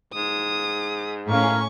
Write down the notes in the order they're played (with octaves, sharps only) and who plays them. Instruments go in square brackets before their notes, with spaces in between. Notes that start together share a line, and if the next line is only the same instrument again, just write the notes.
[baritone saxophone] G#2 [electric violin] D#6
[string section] A2 C#4 [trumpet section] A#3 F5 [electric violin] C#6